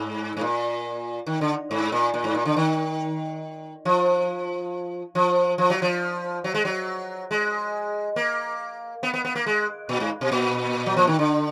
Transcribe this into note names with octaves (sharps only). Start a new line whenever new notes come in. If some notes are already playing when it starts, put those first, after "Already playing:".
Already playing: G#2
G#2
A#2
D#3
D3
G#2
A#2
A#2
G#2
A#2
D3
D#3
F3
F3
F3
F#3
F3
F#3
G#3
F#3
G#3
A#3
B3
B3
B3
A#3
G#3
A#2
G#2
B2
A#2
F#3
F3
D#3
D3